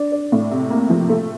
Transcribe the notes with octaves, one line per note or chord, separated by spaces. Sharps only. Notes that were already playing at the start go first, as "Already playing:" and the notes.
Already playing: D4
D4
A2
C3
A#3
F3
A3